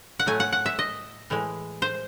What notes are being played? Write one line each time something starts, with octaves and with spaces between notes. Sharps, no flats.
F#5
A2 F#3 A3 G#5
F#5
F#5
E5
D#5
A2 E3 G#3
C5